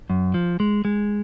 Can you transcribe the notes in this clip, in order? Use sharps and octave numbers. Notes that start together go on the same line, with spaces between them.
F#2
F3
G#3
G#3